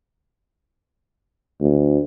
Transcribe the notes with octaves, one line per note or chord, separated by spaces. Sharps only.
D2